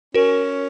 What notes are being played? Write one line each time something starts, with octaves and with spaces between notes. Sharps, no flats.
C#4 F#4 A#4